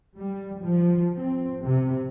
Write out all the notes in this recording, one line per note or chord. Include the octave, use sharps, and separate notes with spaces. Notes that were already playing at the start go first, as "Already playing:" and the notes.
G3
F3
C4
C3